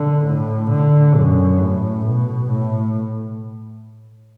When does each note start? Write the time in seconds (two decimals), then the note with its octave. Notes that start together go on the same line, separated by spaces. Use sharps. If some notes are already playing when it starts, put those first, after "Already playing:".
Already playing: D3
0.25 A2
0.71 D3
1.16 F#2
1.61 A2
2.06 B2
2.51 A2